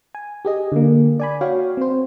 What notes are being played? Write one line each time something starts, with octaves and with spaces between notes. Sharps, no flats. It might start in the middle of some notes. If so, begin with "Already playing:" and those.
G#5
G4 G#4 D#5
D3 A#3
D5 G#5 B5
F#4 C#5 F5 G5
C4 C5